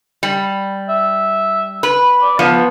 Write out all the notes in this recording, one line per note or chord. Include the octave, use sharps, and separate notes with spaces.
G3
E5
B4
D5
F3 B3